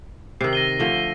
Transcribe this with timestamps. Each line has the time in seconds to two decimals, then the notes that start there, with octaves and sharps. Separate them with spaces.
0.41 C3 D#3 E6 C7
0.53 A#6 D#7 G7
0.79 D3 F3 A3